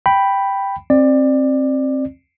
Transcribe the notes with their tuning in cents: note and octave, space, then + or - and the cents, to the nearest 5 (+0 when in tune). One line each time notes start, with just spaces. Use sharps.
G5 +0 B5 +0
C4 +25 D5 +20